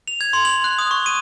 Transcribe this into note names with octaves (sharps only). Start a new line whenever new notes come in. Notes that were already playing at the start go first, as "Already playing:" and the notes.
F7
G#6
C6
F#7
F#6
D#6
C#6
D#7